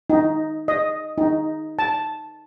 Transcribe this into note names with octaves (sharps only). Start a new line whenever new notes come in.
D#4
D#5
D#4
A5